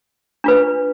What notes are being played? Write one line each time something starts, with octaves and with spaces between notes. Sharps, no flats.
D4 F4 B4